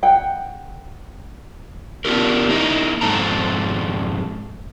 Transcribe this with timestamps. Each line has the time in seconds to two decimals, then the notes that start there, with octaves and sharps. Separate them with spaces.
0.03 F#5 G5
2.05 B3 D4 F4 G4 A#4
2.49 A#3 D#4 E4 D#5
3.01 F2 G#2 C4 A4 A#5